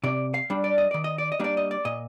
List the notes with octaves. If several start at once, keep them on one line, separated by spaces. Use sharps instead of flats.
C3 D5
F5
G3 D4
D5
D#5
D#3 D5
D#5
D5
D#5
G3 A#3 D4 D5
D#5
D5
A#2 D#5